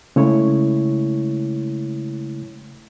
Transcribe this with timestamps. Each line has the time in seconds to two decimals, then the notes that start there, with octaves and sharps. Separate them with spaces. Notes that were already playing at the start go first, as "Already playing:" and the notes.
0.16 C#3 G#3 A3 E4 C#5